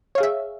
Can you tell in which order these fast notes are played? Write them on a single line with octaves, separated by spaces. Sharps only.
C#5 F5 G#4 E5